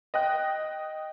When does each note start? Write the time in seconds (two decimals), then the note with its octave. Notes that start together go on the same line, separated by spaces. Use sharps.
0.14 D#5 G5 F#6